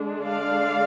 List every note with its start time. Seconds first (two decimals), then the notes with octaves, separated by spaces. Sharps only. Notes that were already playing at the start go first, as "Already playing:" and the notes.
Already playing: D3 G#3 D4
0.24 D5 F5